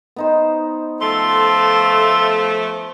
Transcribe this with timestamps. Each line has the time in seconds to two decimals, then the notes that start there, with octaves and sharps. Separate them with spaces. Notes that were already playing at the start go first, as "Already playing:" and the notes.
0.16 B3 D#4 C5
1.01 F3 A3 A4 C6